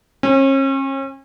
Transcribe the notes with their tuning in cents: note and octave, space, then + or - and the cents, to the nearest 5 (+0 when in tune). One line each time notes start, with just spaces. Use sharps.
C#4 -40